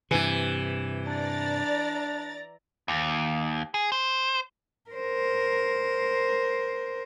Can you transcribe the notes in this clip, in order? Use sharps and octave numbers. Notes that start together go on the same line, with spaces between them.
G2 C3 E3
D4 D5 A#5 A6
D#2
G#4
C5
A#4 C5